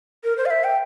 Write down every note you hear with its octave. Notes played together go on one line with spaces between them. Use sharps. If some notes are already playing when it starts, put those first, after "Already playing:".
A#4
C5
F5
E5
G5